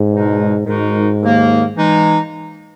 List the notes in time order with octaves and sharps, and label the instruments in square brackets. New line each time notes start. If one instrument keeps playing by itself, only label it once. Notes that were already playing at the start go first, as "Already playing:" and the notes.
Already playing: [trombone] G#2
[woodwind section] E2 B2 G#3 D#4
[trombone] G#2 [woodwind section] D#3 G#3 D#4 F#4 A#4
[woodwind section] D#2 D#3 A#3
E3 G#3 D#4